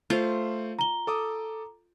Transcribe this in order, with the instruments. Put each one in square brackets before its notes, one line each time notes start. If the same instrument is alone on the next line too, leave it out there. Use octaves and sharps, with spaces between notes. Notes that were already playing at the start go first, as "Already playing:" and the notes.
[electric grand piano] A3 C5 [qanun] F4
[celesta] A#5 G7
[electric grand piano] A4 D6 D#6